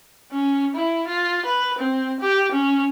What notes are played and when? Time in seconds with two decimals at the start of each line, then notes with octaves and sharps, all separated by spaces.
0.32 C#4
0.75 E4
1.08 F4
1.46 B4
1.78 C4
2.20 G4
2.52 C#4